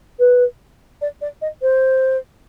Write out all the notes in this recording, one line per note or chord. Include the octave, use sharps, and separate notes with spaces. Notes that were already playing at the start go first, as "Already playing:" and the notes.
B4
D5
D5
D#5
C5